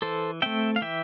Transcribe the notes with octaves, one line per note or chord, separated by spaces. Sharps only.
E3 A4 C5
A3 C4 E5 G5
F5
E3 E5 G5